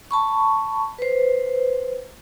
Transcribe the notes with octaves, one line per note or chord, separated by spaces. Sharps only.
A5 B5 C#6
B4 C5